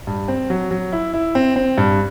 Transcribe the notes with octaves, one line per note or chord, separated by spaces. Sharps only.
G2
C4
F#3
F#3
E4
E4
C4
C4
G2